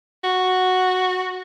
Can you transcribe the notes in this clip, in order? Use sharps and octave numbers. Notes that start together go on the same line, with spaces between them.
F#4